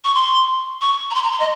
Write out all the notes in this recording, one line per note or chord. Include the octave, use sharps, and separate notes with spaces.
C#6
C6
C#6
A#5
C6
A#5
C6
D#5